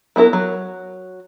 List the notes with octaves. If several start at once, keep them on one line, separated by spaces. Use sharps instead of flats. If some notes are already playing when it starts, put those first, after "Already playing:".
F#3 B3 E4 A#4
F#3